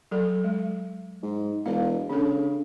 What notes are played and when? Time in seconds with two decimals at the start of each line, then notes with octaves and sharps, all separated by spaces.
0.11 F#3 A4
0.44 G#3
1.23 G#2
1.66 E1 F5
2.09 C#3 D4 A4